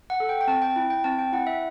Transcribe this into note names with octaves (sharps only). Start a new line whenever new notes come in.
F#5
A4
G5
G5
C4 A5
G5
E4
G5
C4 A5
G5
E4 F#5
E5